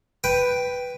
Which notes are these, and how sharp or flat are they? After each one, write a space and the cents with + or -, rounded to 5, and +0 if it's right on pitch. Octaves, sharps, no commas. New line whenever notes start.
B4 +0 G5 +0